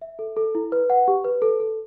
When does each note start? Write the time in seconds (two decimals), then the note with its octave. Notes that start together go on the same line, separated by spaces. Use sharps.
0.02 E5
0.19 A4
0.37 A4
0.55 E4
0.72 B4
0.90 F#5
1.08 G4
1.24 B4
1.42 A4
1.60 A4